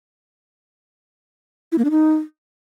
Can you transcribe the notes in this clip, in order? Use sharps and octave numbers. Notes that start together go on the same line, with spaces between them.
E4
A#3
D4
D#4